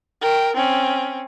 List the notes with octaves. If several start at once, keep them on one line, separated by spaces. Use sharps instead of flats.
A#4 G5
C4 C#4